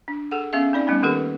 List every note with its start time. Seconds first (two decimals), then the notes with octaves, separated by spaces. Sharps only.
0.08 D4
0.31 G#4 A4 F#5
0.53 B3 C#4 G#4 E5 F5
0.73 C4 D#4 D5
0.87 G3 A3 B3 C#4 D#4
1.03 D#3 A#3 G4 A4 B4